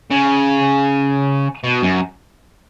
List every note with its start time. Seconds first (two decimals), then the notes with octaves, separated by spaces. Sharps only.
0.11 C#3
1.64 B2
1.82 F#2